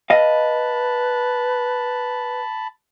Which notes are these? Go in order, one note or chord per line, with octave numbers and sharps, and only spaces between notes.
B4 D#5 F5 A5 B5